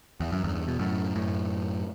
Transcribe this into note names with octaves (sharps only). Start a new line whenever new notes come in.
E2
F#2
E2 G2
B2
F#2 A2
F#2 A2